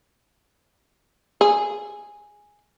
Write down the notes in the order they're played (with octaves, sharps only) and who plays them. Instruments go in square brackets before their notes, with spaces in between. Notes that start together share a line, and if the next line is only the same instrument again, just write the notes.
[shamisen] G#4